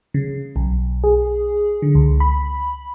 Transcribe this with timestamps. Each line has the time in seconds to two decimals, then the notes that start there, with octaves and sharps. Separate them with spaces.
0.14 C#3
0.56 B1
1.04 G#4
1.82 D3
1.95 C#2
2.20 B5